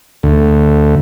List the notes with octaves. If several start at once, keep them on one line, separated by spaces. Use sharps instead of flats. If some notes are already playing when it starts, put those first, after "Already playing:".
D2